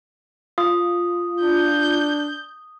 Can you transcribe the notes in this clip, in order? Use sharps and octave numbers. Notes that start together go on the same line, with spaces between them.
F4 D#6
D4 G6